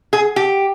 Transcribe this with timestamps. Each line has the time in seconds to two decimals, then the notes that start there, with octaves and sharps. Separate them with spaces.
0.13 G#4
0.36 G4